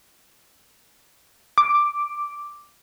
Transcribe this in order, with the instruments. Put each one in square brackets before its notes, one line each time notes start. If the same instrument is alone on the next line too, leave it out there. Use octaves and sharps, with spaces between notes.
[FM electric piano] D6